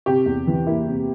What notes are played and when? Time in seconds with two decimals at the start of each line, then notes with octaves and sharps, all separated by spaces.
0.06 C3 G4
0.26 E2
0.47 E3
0.66 A#3 E4
0.87 C3